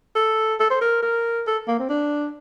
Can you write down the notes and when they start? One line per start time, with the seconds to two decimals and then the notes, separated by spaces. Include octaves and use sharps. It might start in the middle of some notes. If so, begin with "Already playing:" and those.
0.15 A4
0.60 A4
0.70 C5
0.81 A#4
1.02 A#4
1.47 A4
1.68 A#3
1.79 C4
1.89 D4